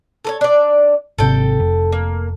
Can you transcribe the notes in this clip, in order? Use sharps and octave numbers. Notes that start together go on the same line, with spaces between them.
A4 A#4 C#5
D4 D5
G#1 C3 A4 G5
F1
A#3